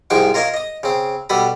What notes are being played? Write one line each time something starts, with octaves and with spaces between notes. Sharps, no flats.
C2 G#2 F3 G#3 G5 C#6
F4 A#4 C#5 D#5 F5
D#5 D#6
C#3 C4
B2 G3 A4 B5 D#6